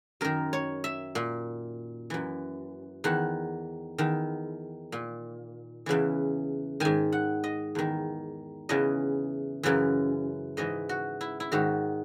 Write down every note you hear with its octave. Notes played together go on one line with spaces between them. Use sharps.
F#2 D#3 A#4
C#5
E5
A#2
F#2 E3
E2 D#3 F#5
E2 D#3
A#2
E2 C#3 E3
G#2 D#3 G#5
F#5
D#5
E2 D#3
E2 C#3 E3 D#5
F#2 C#3 E3
G#2 E3 D#5
F#4
E4
E4
G#2 D#3 F#4